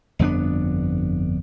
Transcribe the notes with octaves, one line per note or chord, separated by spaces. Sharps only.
G1 F2 B3 D4